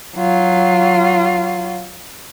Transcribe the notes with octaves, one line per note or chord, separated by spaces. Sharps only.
F#3 F4